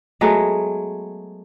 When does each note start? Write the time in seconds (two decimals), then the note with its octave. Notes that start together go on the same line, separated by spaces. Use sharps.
0.21 F#3 G#3 A3 B3